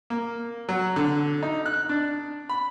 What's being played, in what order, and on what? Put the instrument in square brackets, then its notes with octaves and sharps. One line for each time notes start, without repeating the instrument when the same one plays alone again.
[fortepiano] A#3
F#3
D3
D#4
F#6
D4
B5